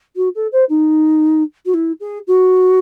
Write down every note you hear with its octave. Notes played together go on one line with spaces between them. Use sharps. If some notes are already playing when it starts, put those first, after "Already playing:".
F#4
A4
C5
D#4
F#4
E4
G#4
F#4